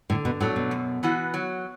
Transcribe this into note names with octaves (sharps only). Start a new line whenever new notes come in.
A2 D3
B2
A2 F#3 A3 D4
B2
F#2
E3 B3 F#4
F#3